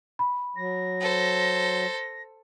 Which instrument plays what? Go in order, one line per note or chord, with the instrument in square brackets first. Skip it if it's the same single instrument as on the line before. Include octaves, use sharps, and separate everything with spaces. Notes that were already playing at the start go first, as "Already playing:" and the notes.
[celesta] B5
[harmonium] F#3 [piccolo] A#6
[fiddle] A4 C5